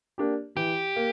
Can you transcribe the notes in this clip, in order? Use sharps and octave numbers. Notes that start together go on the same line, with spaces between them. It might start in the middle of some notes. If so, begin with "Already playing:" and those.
A#3 D4 G4
E3 G4
A#3